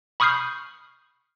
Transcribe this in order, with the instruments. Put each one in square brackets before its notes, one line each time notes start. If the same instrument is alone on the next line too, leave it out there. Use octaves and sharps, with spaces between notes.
[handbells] B5 C#6 D#6 F6 G6 C7